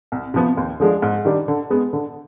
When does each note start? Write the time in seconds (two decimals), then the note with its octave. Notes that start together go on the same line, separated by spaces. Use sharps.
0.12 C2
0.34 C3 F3 B3
0.57 D#2
0.80 D3 F3 G#3 D4
1.02 G#2
1.25 D#3 G3 D4 G4
1.48 D3
1.70 G#3 B3
1.93 D3